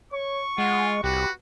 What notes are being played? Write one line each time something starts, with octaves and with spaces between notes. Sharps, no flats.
C#5 C#6
G#3 F4 F#5
C2 F#4 G4 B4